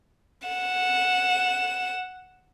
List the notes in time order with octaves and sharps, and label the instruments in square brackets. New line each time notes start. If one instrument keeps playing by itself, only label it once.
[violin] F#5 E7